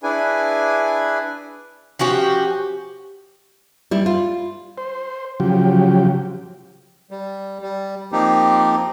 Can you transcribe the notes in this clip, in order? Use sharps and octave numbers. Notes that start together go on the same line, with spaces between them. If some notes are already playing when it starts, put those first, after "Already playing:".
D4 E4 G#4 B4 G#5
F3 C#4 F#4 G4
G3 E4
F4
C5
C#3 F3 F#3 G4
G3
G3
F3 A#3 C4 D#4 G4